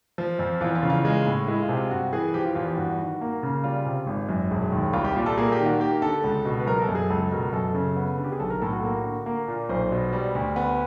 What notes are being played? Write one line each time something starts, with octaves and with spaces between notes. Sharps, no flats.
F3
F2
E2 F4
F4
C#3
F4
G#3
A2
G#3 E4
F4
C3
F4
G2 F#4
E3 G#4
F3 G4
F4
E2 F4
G4
G2 F#4
D#3
A#3
C#3
G3 F4
C3
G#1
F#2
E1
D#2
C2 F4
G4
A#2
A4
A#3 G#4
G4
D#3
F#4
A#3 G4
D3 A4
C#2
B2
B4
F#3 A#4
A4
F#2
G#4
C#2 A4
B2 A#4
F#2 A4
C#3
B3
D3
G4
G#4
B1 A4
A#4
A2 A4
F#4
A#3
D3
A#3
A#2
B1 C5
B2
G3
D2
B3